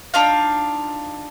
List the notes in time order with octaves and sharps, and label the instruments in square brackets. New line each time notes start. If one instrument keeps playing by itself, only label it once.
[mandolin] D4 D#4 F4 F5